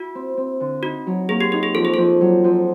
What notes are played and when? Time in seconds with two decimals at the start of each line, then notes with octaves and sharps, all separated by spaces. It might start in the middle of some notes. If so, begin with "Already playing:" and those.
Already playing: E4 F#4
0.15 C4
0.37 C4
0.60 D3
0.83 D#4 F#4
1.07 F#3
1.29 A#3 G#4
1.41 G4
1.52 D#4 G4
1.63 G#4
1.75 F2 A4
1.85 G#4
1.94 F2 A4
2.21 F#3
2.44 F2